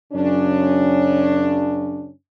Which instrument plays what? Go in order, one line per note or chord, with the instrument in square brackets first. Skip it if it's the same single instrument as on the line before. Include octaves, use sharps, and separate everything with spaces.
[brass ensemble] F#2 C#3 C#4 D4